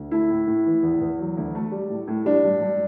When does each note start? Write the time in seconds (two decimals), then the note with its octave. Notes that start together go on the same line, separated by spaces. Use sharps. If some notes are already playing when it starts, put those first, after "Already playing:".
Already playing: D2
0.11 A3 E4
0.30 A2
0.47 A2
0.66 E3
0.83 E2
1.01 E2
1.19 F#3
1.37 D2
1.55 A3
1.72 G3
1.89 A2
2.08 A2
2.25 G3 D4
2.44 G2
2.61 G2